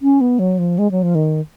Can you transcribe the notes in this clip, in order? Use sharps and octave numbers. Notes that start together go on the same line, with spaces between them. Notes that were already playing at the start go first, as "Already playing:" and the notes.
C#4
B3
F#3
F3
G#3
F#3
F3
D#3